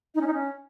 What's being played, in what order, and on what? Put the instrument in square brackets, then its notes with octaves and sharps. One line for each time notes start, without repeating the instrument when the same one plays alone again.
[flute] D#4
C#4
D#4
C#4